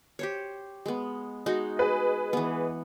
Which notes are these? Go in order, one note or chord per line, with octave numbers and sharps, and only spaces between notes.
G4 C5 C#5
G#3 B3
G#3 D#4 F#4
G#4 B4 D#5
E3 B3